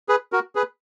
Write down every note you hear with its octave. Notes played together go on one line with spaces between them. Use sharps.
G#4 B4
F#4 A#4
G#4 B4